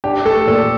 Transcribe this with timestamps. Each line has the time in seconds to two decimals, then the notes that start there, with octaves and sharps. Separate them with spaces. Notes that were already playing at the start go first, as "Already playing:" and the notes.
0.04 D4 G4
0.25 A3 A4
0.47 A#2 A4